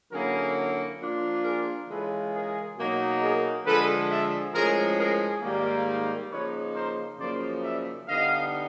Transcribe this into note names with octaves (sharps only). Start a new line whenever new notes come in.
D3 F#3 A#3 C#4 E4 G#4 A#4
F3 A#3 D4 F4
G#4 A#4
C#3 E3 G#3 C#4 F4 A4 B4
G#4 A#4
B2 F#3 A#3 D#4
G#4 A#4
D3 F3 G#3 A4 B4
D5 E5
A2 F3 G#3 C#4 G#4 A#4
G#4 A#4
G#2 D#3 G3 A#3
C#3 F3 A#3 D#4 B4 C#5
A#4 C5
F#2 C#3 F3 A#3 D#4 C5 D5
D5 E5
D3 G3 B3 D#4 D#5 F5